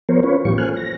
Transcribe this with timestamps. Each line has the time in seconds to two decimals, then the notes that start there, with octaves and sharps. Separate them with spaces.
0.09 F3 B3 A#4 C5 C#5
0.23 C#4 F4 B4 C#5
0.45 A2 E3 F#3 F4 G4 C#6
0.58 A#3 A4 C5 G#5 F6 F#6
0.76 A#6